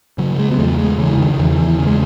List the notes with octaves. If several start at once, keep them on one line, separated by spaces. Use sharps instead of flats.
C#3 F#3
G#3
B3
E2 A3
G#3
C#3 E3
D#3
D#3
E2 E3
E3
C#3
G#3